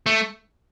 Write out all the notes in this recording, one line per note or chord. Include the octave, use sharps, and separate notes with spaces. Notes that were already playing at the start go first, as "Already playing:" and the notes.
A3